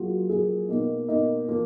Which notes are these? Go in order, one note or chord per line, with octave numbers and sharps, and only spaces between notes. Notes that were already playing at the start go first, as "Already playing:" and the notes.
Already playing: F#3 A#3 F4 G#4
F#3 A#3 F4 G#4
B2 A#3 D#4
B2 A#3 D#4
F3 A#3